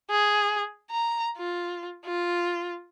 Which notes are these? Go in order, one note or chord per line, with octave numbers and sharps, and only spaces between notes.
G#4
A#5
F4
F4